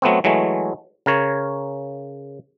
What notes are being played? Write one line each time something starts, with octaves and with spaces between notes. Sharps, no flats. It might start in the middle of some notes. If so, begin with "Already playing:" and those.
F#3 A3 B3 C4
E3 F#3 G#3 A3
C#3 A#4 C#5